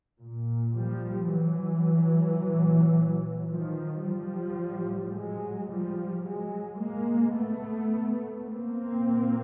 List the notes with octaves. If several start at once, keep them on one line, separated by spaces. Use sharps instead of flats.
A#2
F3 G3
E3 F#3
A#2
D#3 F3
F3 G3
A2
F#3 G#3
F3 G3
F#3 G#3
A2 G#3 A#3
A3 B3
A#3 C4
A#2